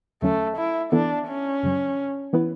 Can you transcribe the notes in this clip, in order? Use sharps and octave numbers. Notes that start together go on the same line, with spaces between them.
E2 D3 F#3 A3 C#4
E4
E3 B3 D4 E4 A4
C#4
F#2 C#3 F#3
E3 B3 E4 B4